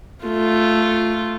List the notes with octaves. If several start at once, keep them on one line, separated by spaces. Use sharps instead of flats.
A3 F4